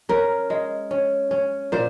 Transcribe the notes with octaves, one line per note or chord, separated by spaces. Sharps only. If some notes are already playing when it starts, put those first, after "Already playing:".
C#4 A#4
G#3
C#4
C#4
A#2 C5